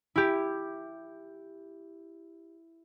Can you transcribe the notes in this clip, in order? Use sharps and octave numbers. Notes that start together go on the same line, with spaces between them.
E4 G4